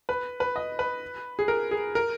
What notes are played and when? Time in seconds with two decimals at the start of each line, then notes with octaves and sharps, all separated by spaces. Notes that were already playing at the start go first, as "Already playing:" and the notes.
0.09 B4
0.40 B4
0.56 D#5
0.79 B4
1.39 G#4
1.48 A#4
1.71 G#4
1.95 A#4